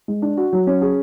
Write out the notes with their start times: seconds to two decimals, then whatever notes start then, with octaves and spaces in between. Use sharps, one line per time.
0.08 G#3
0.22 D4
0.37 F#4
0.53 F#3
0.67 C#4
0.82 G#4